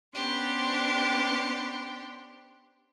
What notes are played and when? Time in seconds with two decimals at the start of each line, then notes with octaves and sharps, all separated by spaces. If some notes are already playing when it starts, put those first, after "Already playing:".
0.13 B3 C#4 D4 G4 C5